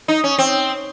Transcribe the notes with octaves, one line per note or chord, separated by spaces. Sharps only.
D#4
C#4
C4